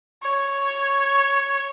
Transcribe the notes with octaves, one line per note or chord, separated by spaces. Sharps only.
C#5